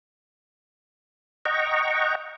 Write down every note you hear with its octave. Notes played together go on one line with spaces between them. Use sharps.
D#5 F#5 G5 A#5 C#6